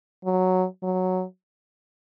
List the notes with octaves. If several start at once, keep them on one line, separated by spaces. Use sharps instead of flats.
F#3
F#3